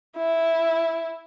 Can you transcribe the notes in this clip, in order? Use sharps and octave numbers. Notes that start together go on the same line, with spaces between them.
E4